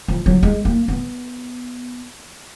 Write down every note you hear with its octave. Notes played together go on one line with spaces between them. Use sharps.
F3
F#3
G#3
A#3
B3